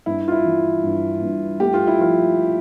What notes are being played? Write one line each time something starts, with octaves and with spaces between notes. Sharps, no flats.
G2 E4
F4
E4
E3
G2
G2
A3 G4
F4
E4
F3 F4